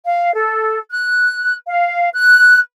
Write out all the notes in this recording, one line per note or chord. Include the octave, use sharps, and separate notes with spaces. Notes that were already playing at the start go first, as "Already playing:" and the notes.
F5
A4
F#6
F5
F#6